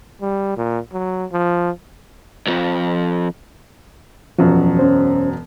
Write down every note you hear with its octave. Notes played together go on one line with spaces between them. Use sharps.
G3
A#2
F#3
F3
C2 F2
E1 F#2 F3 F#4
C#4 C5